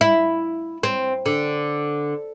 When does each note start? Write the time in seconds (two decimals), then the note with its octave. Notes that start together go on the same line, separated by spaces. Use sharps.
0.01 E4
0.83 C4
1.26 D3